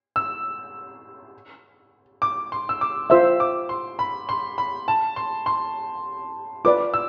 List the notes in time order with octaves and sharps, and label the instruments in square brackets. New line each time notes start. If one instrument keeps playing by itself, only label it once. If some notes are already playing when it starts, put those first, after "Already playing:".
[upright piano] E6
D6
C6
E6
D6
[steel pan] F4 C5 E5 [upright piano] E6
[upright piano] D6
C6
B5
C6
B5
A5
C6
C6
[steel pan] F4 B4 D5 [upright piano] D6
[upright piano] E6